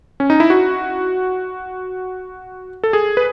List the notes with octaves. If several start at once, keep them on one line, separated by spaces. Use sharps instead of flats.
C#4
D#4
E4
F#4
A4
G#4
B4